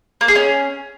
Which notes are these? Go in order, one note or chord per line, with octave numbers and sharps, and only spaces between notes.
A#3
G#4
C#4